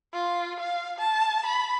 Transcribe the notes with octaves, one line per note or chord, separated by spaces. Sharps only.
F4
F5
A5
B5